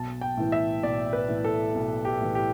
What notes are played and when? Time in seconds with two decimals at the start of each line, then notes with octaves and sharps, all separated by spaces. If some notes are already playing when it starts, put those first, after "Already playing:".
Already playing: B1 A5
0.21 G5
0.37 A2 E3
0.52 E5
0.83 B1 D5
1.13 B4
1.28 A2 E3
1.44 A4
1.75 B1
2.05 G4
2.21 A2 E3
2.35 G4